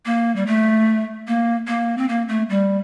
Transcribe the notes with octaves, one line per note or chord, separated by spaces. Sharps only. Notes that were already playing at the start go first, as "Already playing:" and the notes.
A#3
G3
A3
A#3
A#3
C4
A#3
A3
G3